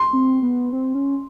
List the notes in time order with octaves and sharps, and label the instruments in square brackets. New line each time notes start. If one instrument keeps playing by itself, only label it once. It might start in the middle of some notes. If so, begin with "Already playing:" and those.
Already playing: [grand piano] C6
[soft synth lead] C4
B3
C4
C#4